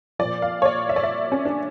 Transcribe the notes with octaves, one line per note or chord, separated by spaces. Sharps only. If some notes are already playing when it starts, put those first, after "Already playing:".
A#2 F3 D5
F5
C#5
D5
E5
D5
E5
C#4
D4